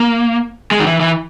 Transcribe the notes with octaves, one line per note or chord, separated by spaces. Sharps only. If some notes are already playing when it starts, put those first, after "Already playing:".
Already playing: A#3
G#3
D#3
E3
E3